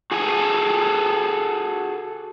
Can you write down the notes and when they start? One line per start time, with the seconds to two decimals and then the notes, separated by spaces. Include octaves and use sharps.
0.11 F#4 G#4 A4 G#5